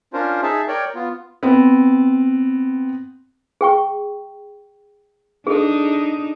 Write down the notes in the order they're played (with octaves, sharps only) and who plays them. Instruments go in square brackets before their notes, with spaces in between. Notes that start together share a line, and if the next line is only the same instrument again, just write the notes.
[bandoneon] C#4 D4 F4 A#4 C5
D#4 G#4 E5 A5
A#4 C#5 D5 G5
B3 F4
[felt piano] B3 C4
[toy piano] G#4 G5 C#6
[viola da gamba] D4 D#4 [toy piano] G#4 A4